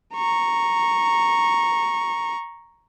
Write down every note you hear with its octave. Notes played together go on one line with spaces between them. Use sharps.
A#5 C#6